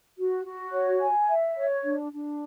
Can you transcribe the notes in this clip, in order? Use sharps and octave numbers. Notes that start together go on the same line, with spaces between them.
F#4
F#4
C#5
G#5
E5
C#5
D4
D4